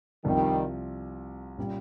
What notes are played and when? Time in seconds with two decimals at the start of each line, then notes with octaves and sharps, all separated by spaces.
0.25 C2 C3 D#3 F3 G3
1.57 A#2 G3 C#4